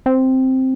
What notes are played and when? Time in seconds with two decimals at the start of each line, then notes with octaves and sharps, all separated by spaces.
0.06 C4